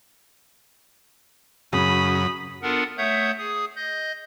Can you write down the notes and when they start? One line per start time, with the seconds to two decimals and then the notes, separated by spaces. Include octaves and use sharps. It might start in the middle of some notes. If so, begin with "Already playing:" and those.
1.73 F#2 C#3 B5 D#6
2.63 B3 D4 F4 A4 A#4 F#5
2.98 A3 C#5 E5 F#5 D#6 G6
3.38 G#4 D#6
3.76 D#5 G6